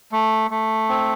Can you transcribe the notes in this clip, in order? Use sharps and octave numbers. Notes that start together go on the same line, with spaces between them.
A3
A3
C4